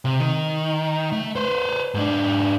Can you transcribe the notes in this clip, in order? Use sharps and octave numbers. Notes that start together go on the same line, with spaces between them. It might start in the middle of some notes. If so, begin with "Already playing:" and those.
C3
D#3
A3
B4 C5
G#2 D4